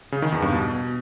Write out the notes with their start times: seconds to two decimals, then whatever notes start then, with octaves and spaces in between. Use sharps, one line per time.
0.12 C#3
0.22 D#3
0.32 E2
0.42 G2
0.52 B2